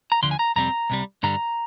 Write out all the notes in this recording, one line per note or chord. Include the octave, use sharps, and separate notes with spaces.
A#5
D2 D3 F3 C6
G#5
A#5
F2 C3 G3 C4 A#5
C2 C3 G3
G2 D3 G3 A#5